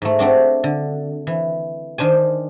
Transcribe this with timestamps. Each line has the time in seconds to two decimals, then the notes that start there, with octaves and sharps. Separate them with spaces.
0.02 G#2 A3
0.19 A3 C4 D4 F#4
0.64 D3
1.27 E3
1.98 D#3 D4 C5 G#5